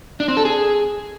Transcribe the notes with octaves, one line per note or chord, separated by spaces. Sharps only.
D4
C4
A4
G#4